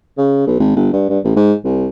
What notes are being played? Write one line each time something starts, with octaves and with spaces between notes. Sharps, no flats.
C#3
B1
G#1
G1
G2
G2
A1
G#2
C2